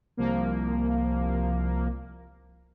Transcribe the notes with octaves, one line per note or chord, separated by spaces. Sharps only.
C2 F3 A#3